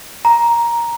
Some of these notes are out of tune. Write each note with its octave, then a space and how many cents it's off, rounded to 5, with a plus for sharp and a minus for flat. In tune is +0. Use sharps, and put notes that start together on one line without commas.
A#5 +10